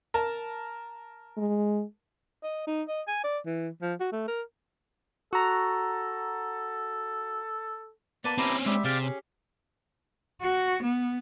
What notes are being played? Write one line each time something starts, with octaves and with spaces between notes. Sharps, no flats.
A#4 A5
G#3
D#5
D#4
D#5
G#5
D5
E3
F3
F#4
A3
A#4
F#4 A4 A#5
A#3 B3 B4 D5 A5
C4 C#4 E4 G4 A#5
G3 G#3 G4 E5
C3 G4 G#4 D5 F5 G5
C#4
F#4
B3